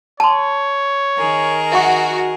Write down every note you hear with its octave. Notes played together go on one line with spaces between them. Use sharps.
C#5 A5 C6
D#3 G#4 A#4
F#4 E5 C#6